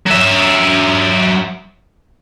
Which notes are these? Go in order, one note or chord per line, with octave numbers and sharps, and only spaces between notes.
F#3 E5